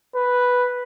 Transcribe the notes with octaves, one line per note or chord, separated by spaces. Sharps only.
B4